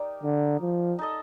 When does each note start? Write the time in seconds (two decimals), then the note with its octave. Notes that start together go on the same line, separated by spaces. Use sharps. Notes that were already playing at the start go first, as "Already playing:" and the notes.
Already playing: D#4 G4 A#4 D5
0.23 D3
0.61 F3
0.99 D#4 A4 D#5